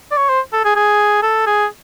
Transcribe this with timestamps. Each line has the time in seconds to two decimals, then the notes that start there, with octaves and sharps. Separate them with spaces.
0.11 D5
0.17 C#5
0.30 C5
0.53 A4
0.65 G#4
0.76 G#4
1.23 A4
1.46 G#4